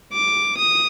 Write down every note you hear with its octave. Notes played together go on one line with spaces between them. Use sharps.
D6
D#6